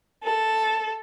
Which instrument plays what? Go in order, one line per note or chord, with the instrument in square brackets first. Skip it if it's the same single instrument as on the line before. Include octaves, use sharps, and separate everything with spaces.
[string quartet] A4